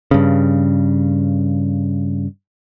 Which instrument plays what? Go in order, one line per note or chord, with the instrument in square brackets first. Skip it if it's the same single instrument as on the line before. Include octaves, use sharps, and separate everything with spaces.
[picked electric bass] G2 C#3